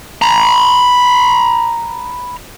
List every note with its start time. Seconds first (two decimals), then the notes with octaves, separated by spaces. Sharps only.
0.22 A#5 B5